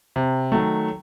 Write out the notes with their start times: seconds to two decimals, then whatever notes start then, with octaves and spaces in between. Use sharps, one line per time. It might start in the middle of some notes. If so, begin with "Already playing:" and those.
0.16 C3
0.52 D#3 F#3 A3